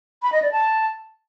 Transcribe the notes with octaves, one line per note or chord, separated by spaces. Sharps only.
B5
D#5
D5
A5